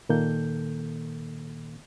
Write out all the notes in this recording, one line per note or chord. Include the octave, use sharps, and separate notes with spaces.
A#2 D#3 A#3 A4 G6